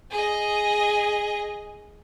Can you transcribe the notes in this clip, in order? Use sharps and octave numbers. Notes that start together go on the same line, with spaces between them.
G#4 D#5